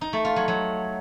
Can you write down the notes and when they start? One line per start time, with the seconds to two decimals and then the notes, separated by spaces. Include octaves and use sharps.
0.01 D#4
0.13 A3
0.25 F4
0.36 F#3
0.48 F#3